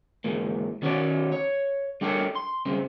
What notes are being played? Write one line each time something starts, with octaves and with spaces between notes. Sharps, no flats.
G#2 E3 A#3
D#3 C#4 F#4 B4 C#5 D5
C#5
G3 D4 G4 A4 A#4 C#5
C6
G2 C#3 C4